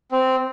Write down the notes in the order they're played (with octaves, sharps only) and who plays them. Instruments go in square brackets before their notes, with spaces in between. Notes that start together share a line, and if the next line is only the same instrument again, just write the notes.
[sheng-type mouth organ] C4